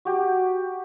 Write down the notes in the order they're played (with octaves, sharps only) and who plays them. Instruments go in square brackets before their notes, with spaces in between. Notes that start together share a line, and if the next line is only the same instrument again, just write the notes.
[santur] F#4 G4